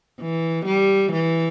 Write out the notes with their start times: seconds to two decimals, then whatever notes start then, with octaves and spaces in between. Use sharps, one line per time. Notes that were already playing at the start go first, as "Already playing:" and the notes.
0.20 E3
0.66 G3
1.12 E3